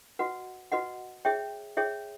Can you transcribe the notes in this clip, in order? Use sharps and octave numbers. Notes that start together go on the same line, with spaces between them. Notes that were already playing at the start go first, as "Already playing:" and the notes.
F#4 B4 D#5 F#5
F#4 B4 D#5 F#5
G#4 C#5 E5 G5
G#4 C#5 E5 G5